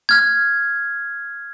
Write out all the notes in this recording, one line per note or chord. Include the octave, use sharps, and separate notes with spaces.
F6 G#6